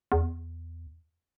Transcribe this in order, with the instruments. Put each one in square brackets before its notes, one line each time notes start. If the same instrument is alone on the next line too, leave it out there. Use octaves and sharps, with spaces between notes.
[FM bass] E2